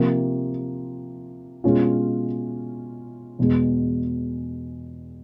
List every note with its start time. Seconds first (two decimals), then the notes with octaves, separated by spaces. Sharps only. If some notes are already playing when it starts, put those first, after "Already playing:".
Already playing: C3 F3 A#3
1.64 B2 G#3 C#4 F4
3.39 E2 B2 G#3